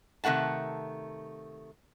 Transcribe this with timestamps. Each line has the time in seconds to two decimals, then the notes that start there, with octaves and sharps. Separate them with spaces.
0.24 C3 D#3 A3 F#5 A5